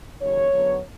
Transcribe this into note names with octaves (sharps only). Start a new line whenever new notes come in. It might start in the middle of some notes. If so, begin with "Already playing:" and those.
D#2 C#3 F#3 C#5
F#2 D3 F#3 B3